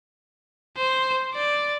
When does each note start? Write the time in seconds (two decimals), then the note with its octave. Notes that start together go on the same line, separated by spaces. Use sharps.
0.77 C5
1.34 D5